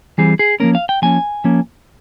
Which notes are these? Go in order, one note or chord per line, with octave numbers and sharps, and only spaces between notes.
E3 G3 C4 G#4
G#4
F3 A#3 C#4 A#4
F5
G5
F3 A#3 C#4 G#5
F3 A#3 C#4